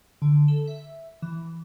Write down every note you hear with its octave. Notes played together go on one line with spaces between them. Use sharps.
D3
A4
E5
E3